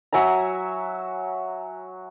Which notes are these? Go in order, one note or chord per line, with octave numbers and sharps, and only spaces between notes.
F#3 E5 G#5 A#5